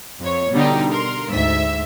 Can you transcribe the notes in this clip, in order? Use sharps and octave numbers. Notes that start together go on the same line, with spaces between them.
F2 C#5
B2 D3 G3 D#4 G4
A#4 C6
D2 G#2 E5 E6 B6